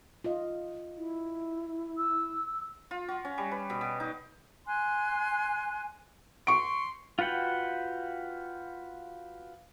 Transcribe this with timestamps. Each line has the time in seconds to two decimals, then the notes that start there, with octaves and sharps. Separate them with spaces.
0.24 F4 D#5
0.97 E4
1.98 E6
2.91 F4
3.08 F#4
3.25 C#4
3.38 G3
3.52 B4
3.70 B2
3.81 B2
4.00 D#4
4.66 G#5 C6 F#6
6.47 C6 C#6 D7
7.19 F4 F#4 B4 F#5 G5